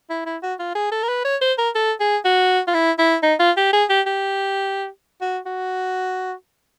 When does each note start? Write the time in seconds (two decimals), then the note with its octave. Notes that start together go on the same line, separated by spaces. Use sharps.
0.10 E4
0.26 E4
0.42 F#4
0.59 F4
0.75 G#4
0.92 A4
1.03 A#4
1.08 B4
1.25 C#5
1.41 C5
1.58 A#4
1.75 A4
2.00 G#4
2.25 F#4
2.67 F4
2.74 E4
2.98 E4
3.23 D#4
3.39 F4
3.57 G4
3.73 G#4
3.89 G4
4.06 G4
5.21 F#4
5.46 F#4